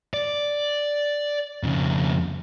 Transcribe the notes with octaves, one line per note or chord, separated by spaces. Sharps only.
D5
F2 C#3